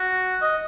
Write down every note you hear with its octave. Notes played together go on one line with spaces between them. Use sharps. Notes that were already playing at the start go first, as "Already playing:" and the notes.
Already playing: F#4
D#5